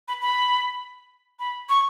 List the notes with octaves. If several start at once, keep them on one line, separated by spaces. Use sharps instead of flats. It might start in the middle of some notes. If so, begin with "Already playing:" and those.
B5
B5
B5
C#6